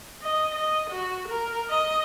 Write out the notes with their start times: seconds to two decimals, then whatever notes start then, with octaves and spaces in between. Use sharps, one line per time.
0.23 D#5
0.55 D#5
0.91 F#4
1.29 A#4
1.70 D#5